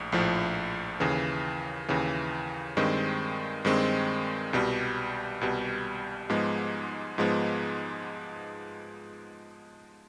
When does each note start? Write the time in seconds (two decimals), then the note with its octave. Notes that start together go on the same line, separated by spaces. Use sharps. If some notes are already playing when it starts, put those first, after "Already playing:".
Already playing: A#1 A2
0.12 A#1 A2 F3
1.00 D#2 C#3 E3
1.88 D#2 C#3 E3
2.77 G2 D#3 G#3 C4
3.65 G2 D#3 G#3 C4
4.53 C2 B2 G3
5.41 C2 B2 G3
6.30 G#2 F3 G#3 B3
7.18 G#2 F3 G#3 B3